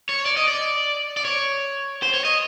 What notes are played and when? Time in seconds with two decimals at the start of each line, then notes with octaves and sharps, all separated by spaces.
0.09 C#5
0.26 D5
0.37 D#5
0.48 D5
1.17 D5
1.25 C#5
2.03 C5
2.14 C#5
2.25 D#5